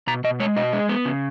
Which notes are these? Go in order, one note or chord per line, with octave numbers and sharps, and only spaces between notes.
B2 A#5
B2 D#5
G#3 C#5
B2 D#5
G#3
B3
C#3